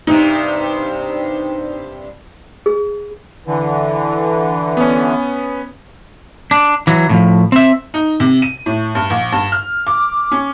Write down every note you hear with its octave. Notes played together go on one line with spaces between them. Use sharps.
G2 C3 D#4
G#4
D3 E3
B3 C#4
D4
E3 F#3
A2 C#3 F3
C4 E5
D#4
C3
D#7
A2
G2
A#1
G2
F6
D6
C#4